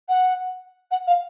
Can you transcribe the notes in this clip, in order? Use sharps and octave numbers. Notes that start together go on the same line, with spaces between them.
F#5
F#5
F5